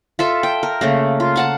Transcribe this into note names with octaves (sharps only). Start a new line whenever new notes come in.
F4 A4 E5
G5
A#4
C#3 A3 A#3
F4
F5 F#5 A5